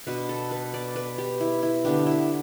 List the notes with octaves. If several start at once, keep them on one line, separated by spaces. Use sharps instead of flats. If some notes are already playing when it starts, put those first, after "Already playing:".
B2 B3 D4 B4
A4
B4
D5
B4
G4
E4
E4
D3 B3 D4 G4
E4